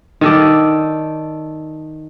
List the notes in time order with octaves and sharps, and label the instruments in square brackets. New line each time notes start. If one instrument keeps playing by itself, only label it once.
[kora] D#3 A4 D5